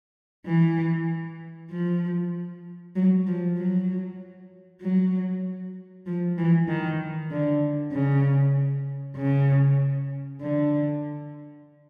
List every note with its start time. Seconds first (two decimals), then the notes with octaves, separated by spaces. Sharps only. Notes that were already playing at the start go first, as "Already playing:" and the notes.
0.46 E3
1.71 F3
2.96 F#3
3.27 F3
3.57 F#3
4.82 F#3
6.06 F3
6.38 E3
6.68 D#3
7.31 D3
7.92 C#3
9.16 C#3
10.41 D3